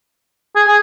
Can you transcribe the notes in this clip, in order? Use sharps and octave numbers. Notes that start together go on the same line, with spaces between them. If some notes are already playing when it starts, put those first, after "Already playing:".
G#4
G#4